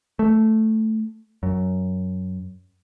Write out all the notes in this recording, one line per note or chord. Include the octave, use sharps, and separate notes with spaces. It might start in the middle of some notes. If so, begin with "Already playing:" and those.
A3
F#2